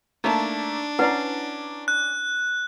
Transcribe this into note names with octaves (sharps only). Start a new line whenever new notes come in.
A3 A#3 D4 D#4
C#4 E4 B4 D5 F#5 A#5
F#6